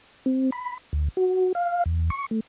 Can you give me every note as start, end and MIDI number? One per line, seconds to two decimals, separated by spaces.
0.26 0.50 60
0.52 0.78 83
0.93 1.08 38
1.17 1.52 66
1.55 1.84 77
1.86 2.10 40
2.10 2.26 85
2.31 2.40 57